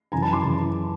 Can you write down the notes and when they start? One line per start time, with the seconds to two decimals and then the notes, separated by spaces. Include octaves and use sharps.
0.12 F#2 C#3 E3 G#5 A#5
0.22 A5 B5
0.33 C6 D6
0.44 C#3 E3